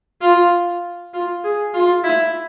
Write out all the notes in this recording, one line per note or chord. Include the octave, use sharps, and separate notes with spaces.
F4
F4
G#4
F4
E4